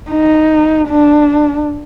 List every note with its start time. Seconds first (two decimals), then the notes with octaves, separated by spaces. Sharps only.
0.10 D#4
0.88 D4